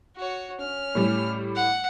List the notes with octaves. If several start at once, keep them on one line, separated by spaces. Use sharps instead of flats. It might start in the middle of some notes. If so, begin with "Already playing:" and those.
F#4 C#5
C#4 F6
A2 G3
F#5